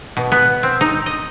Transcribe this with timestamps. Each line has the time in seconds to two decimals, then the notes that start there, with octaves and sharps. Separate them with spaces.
0.17 B2
0.32 B3
0.63 C4
0.81 D#4
1.06 D#5